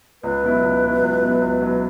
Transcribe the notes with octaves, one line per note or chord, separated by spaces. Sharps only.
C#2 B4
B2 F#3 E4
C#2
B2 F#3 E4
C#2
B2 F#3 E4
C#2
B2 F#3 E4